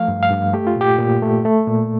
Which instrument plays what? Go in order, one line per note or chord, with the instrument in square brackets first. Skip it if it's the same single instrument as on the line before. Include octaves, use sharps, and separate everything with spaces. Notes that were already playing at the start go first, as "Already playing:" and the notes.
Already playing: [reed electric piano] F3 A3 F5
G2
F5
G2
A3 G4
F4
A#2 G4
A#2
A3
A3
A#2